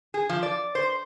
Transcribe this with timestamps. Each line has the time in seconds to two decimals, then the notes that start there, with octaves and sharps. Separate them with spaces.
0.14 G#4
0.29 F3
0.43 D5
0.75 C5